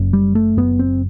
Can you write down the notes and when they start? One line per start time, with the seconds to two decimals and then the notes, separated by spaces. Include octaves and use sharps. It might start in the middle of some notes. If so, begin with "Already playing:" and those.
Already playing: F#1 F#2
0.13 G3
0.35 A3
0.57 F#1 F#2 B3
0.79 C4